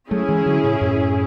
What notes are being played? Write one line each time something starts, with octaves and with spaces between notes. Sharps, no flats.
F#3 A3 C#4 E4 G#4
E3 G#3
D3 F#3
A2 C#3
F#2 A2